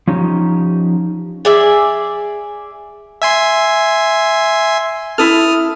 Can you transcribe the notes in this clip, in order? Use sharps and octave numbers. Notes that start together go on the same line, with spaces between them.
F3 C#4 D#4 G4
G#4 D5 E5
E5 G#5 C6
E4 A4 D#6 F6